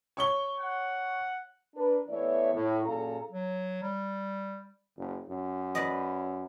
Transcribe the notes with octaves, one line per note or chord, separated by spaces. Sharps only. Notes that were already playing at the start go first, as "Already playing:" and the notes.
C#5 C#6 G7
F#5
D4 A#4 B4
E3 A3 B3 C#5 D5 E5
A2
F#2 A#2 G#4 A4 F5 A#5
F#3
G3
F#1
F#2
B4 D5 D#5